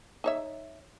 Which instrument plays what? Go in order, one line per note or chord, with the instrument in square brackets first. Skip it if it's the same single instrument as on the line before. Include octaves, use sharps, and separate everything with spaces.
[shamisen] D#4 C#5 E5